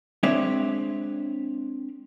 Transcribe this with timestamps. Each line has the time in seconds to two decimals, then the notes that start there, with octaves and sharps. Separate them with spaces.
0.23 G#3 C4 D4 C#5 E5